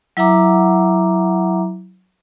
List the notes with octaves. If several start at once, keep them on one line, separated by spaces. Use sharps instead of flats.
F#3 E4 E5 F#5 A#5 D6